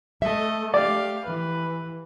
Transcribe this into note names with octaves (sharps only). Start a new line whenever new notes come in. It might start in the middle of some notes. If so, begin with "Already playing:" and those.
A3 A4 D#5 E5
G4 D5 F5
E3 B4